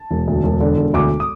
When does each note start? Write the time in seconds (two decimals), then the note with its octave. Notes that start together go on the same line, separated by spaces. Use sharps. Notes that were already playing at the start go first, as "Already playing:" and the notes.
Already playing: A5
0.11 E1
0.27 D2
0.44 E1
0.60 D3
0.77 E1
0.94 D2 D6
1.20 D#6